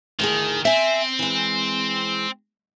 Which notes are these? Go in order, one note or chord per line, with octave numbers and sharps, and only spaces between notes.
D2 A2 D#3 G#4
C4 E5 G#5
E3 G#3